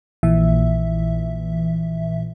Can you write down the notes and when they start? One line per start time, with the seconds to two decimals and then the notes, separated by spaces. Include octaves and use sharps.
0.23 A#1 A#2 E3 E5